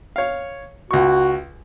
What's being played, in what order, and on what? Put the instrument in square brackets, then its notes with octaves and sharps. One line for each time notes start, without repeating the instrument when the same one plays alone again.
[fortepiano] C#5 F5
[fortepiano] C#2 C#6 [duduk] F#4